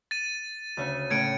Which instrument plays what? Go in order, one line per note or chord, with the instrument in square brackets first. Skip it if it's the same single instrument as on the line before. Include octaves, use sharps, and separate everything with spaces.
[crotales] A6 D#7
[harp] D2 C#3
[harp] A2 C#3 [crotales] G#6 C#7 D7